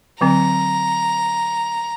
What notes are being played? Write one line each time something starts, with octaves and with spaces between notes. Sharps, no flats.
D3 F#3 C4 A#5